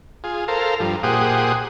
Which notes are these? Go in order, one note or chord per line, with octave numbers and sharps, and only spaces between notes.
F4 G#4
A4 A#4 C5 F5
G2 F3
A#2 G4 G#4 C5 F#5 D#6